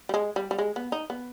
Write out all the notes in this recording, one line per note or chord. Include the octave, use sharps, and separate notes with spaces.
G3
G#3
G3
G3
G#3
B3
D#4
B3